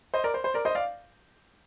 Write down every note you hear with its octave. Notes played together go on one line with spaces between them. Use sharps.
C5 D#5
A#4 D5
C5
C5
A#4 D5
C5 D#5
D5 F5